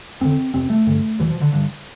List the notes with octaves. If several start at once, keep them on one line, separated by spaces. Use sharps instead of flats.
F2 D3 C4
F2 C3 C4
A3
G2 D3
E2 B2 E3
F3
D3
G2 D3